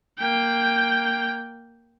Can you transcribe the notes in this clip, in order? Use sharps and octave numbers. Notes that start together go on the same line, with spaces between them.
A#3 G5